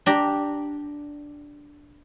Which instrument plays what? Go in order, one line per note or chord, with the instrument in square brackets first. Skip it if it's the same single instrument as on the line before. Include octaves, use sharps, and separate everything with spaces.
[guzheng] D4 G4 A#5